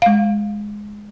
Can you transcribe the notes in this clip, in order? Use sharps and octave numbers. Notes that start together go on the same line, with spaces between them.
G#3 F5